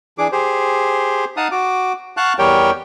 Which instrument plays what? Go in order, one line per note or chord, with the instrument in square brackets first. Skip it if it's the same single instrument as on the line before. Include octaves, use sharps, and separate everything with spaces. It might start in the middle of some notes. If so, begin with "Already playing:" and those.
[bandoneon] E3 D4 G#4 D6
G4 G#4 C5
D#4 F5 F#5 A5 D#6
F#4 D6
F5 F#5 A5 C#6 F#6
E2 G3 G4 A#4 C#5 G5